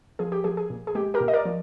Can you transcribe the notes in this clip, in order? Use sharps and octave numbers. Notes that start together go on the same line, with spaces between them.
F3 G#4
G4
F3 G#4
G#4
A#2
G#4
G#3 G4
G4 A#4
A#2
D#5
A#4 D5
F3